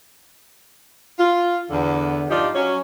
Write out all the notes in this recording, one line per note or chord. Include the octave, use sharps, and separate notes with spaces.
F4
E2 D3
G2 F3 D#4 F4 G4 D5
F#3 C#4